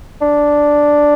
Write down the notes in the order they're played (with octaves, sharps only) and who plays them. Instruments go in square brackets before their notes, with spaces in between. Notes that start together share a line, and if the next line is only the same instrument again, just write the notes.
[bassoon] D4